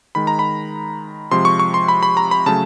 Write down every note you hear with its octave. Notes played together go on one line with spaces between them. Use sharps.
D#3 G#3 B5
A#5
B5
C3 F3 G#3 C6
C#6
C#6
C6
B5
B5
A#5
B5
C#3 F#3 A3 A5